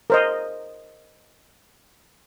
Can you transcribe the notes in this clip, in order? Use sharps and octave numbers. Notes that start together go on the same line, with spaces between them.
A#4 C5 D#5